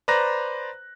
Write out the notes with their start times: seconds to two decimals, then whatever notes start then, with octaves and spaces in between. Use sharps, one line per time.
0.08 B4 C5 D5 A#5 F#6 A#6